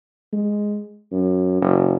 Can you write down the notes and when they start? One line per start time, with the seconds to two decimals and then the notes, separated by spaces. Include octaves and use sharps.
0.33 G#3
1.12 F#2
1.62 F#1